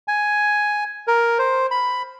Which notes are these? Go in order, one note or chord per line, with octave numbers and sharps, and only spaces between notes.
G#5
A#4
C5
B5